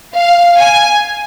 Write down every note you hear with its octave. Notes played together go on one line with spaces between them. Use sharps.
F5
G#5